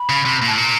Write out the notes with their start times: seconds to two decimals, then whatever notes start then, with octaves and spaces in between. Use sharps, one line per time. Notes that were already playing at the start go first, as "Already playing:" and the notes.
Already playing: B5
0.09 C#3
0.26 C3
0.42 A#2
0.47 A2 A5
0.57 A#2 A#5